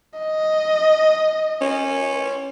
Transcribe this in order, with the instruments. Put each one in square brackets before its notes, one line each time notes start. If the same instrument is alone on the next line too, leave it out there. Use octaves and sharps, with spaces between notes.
[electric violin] D#5
[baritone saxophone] C#4